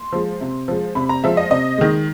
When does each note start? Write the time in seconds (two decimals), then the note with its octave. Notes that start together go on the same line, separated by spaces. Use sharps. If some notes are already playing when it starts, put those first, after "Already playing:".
Already playing: C6
0.12 F3 G#3
0.41 C3
0.68 F3 G#3
0.95 C3 B5
1.09 A#5
1.23 F3 G#3 E5
1.37 D#5
1.50 C3 D#5
1.78 D#3 G#3